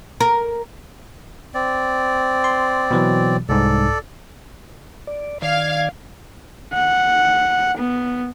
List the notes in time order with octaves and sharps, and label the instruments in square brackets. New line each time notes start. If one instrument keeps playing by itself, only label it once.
[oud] A#4
[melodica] C4 D5
[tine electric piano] C6
B2 E3 F#3
[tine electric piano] C2 G#2 [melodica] A4 D5
[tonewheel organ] D5
[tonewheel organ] D#3 D5 G#6 [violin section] F5
[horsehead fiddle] F#5
B3